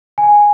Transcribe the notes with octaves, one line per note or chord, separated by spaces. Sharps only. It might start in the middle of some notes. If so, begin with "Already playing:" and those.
G#5